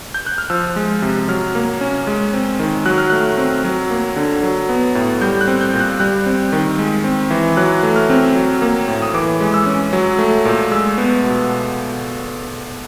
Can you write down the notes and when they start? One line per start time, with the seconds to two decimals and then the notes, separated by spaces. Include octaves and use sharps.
0.14 G6
0.26 F#6
0.38 F6
0.50 F3 E6
0.76 G#3
1.02 C3
1.28 F#3 F6
1.55 A#3
1.81 C#4
2.07 G#3
2.33 C4
2.59 D#3
2.86 F#3 F#6
2.98 F6
3.10 A3 F#6
3.38 C4
3.64 F#3
3.91 A#3
4.16 D3
4.43 F#3
4.69 B3
4.95 A2
5.21 G3 G6
5.41 F#6
5.48 C4
5.61 G6
5.74 A#2
5.80 F#6
6.00 G3 F#6
6.26 C4
6.52 D#3
6.79 G#3
7.04 C4
7.31 E3
7.57 F#3 F#6
7.83 A3
7.96 F6
8.10 C4
8.35 F#3
8.62 A#3
8.88 A2
9.02 D#6
9.14 E3 D6
9.40 G#3
9.54 E6
9.66 C#4
9.93 F#3
10.19 A3
10.45 A#2
10.71 G#3 E6
10.98 B3
11.24 B2